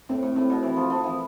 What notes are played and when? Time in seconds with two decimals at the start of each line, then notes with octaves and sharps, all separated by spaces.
0.09 A2 C4
0.23 A2
0.36 A2 C4
0.50 B2
0.63 E3 C4
0.76 F3
0.90 F3 C4
1.04 E3